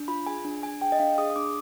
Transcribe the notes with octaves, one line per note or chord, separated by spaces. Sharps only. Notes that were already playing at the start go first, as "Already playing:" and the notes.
Already playing: D4
F4 B5
G#4 G#5
D4
D4 G#5
G#4 G5
D#5
D4 F5
G#4 D#6
D#6
D4 D6